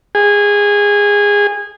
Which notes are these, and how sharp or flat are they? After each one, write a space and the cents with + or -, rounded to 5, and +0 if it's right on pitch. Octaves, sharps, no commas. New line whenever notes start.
G#4 -20